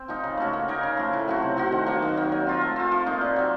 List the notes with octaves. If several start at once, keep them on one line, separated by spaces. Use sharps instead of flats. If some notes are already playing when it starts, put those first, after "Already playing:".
Already playing: C4 C5
F3 A#3 D#4
C#3
A3 C#4 F#4
A#3
D#4 A#4 C#5
C#3
F3 A3
A2
F#3 C4 F#4
C3
F3 C4 F#4
D#3
F#3 A#3
D#3
F#3 A#3
F#3
C4 F4 A#4
A3
C4 F4
F3
A#3 D#4 A#4
A#2
F#3 C4